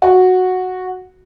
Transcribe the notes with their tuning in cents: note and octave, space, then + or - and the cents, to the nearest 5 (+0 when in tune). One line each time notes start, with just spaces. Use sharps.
F#4 -5